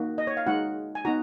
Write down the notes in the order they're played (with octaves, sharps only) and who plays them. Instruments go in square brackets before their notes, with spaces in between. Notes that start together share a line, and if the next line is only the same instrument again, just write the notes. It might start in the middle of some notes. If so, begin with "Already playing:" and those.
Already playing: [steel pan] A#3 D#4 F#4
D#5
C#5
F5
G#3 D#4 F#4 F#5
G#5
B3 D#4 F#4 A#5